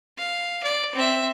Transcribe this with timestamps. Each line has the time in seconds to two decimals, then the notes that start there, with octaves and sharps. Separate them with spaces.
0.18 F5
0.63 D5
0.95 C4 E5